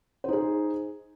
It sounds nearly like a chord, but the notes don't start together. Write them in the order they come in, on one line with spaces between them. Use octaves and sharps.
C5 D#4 G#4